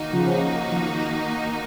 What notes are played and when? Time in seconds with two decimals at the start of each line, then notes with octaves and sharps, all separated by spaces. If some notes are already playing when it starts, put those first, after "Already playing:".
Already playing: D#3 A#3 D#4 F#4
0.13 C#3 F3
0.72 F3